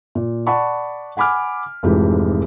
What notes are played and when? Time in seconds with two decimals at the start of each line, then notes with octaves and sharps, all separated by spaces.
0.15 A#2
0.47 D5 F#5 A5 B5 C#6
1.17 F#5 G#5 B5 D6 F6
1.83 F1 F2 G#2 E3 G#3 G4